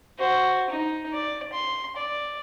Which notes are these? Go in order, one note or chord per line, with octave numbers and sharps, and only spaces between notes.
F#4 C5
D#4
D5
C6
D5